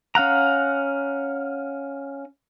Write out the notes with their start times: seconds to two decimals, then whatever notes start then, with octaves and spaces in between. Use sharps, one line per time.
0.15 C#4 F5 F#5 A#5